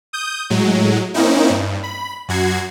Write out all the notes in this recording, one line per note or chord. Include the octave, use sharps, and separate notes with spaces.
D#6 G6
A2 F#3 G#3
A#3 C4 C#4 D#4 E4
G2
B5
F#2 F#4 G#6 C7